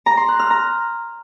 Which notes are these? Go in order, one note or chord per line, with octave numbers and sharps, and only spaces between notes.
A#5
C6
F#6
F6
A#5